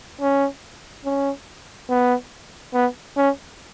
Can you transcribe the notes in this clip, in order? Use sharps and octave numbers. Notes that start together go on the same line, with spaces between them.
C#4
C#4
B3
B3
C#4